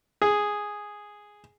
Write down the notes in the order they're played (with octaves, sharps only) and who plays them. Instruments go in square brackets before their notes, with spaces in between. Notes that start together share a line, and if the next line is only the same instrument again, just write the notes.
[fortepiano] G#4